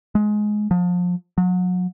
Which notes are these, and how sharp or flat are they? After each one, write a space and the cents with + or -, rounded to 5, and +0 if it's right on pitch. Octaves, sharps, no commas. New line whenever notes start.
G#3 +15
F3 +30
F#3 -35